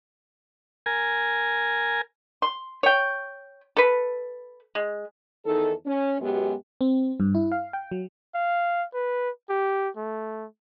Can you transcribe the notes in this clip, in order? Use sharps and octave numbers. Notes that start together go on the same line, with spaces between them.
A#4 G#5
C6
C#5 G5
A4 B4
G#3
E2 D#3 D#4 A4
C#4
F#2 B2 G#3 B3 G4
C4
G2
E4
F5
G5
F#3
F5
B4
G4
A3